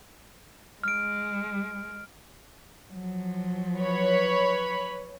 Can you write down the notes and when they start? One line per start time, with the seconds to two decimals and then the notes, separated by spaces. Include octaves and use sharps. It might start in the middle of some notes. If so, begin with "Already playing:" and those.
0.83 G#3 F6 D7
2.92 F3 F#3
3.79 B4 C#5 B5